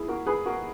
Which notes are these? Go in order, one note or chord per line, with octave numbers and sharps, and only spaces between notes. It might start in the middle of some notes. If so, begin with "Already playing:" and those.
Already playing: E4 G#4
F#4 A#4
G#4 B4
F#4 A#4